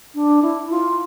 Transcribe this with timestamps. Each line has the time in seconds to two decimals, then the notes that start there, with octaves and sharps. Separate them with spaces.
0.15 D4
0.42 E4
0.70 F4